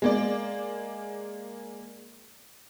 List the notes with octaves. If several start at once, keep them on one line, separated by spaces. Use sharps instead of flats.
G#3 A#3 D5